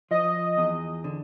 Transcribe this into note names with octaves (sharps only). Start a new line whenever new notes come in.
F3 D#5
E2
D3